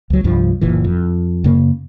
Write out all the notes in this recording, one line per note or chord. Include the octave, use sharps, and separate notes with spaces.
C#2 F#3
C2 G2 F3
F#1 A#2 E3
F2
F#2 C#3 A#3